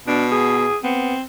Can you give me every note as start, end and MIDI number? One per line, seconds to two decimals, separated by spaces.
0.07 0.66 47
0.07 0.25 62
0.31 0.76 68
0.84 1.14 59
0.84 1.22 60